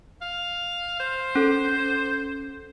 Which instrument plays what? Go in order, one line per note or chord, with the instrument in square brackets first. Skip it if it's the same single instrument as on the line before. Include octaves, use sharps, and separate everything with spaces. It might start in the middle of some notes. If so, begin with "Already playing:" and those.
[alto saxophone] F5
C5
[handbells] C#4 A4